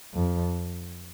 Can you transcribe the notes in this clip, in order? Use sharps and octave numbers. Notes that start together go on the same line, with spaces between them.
F2